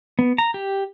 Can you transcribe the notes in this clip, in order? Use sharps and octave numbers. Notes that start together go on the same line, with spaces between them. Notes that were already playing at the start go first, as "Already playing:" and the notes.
B3
A#5
G4